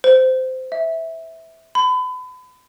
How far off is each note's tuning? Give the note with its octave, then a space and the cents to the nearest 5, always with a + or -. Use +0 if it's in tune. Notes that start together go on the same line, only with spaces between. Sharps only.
C5 -15
E5 -10
B5 +35